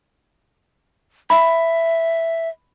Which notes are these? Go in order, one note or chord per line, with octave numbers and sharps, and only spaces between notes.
E5 B5